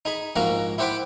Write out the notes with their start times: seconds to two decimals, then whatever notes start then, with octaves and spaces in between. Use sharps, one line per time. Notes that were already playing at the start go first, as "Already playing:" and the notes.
0.05 D#4 G#4 B5
0.36 A#1 G#2 A#3 F#4 F5 A#5
0.78 E4 G4 C5 F#5 B5 D6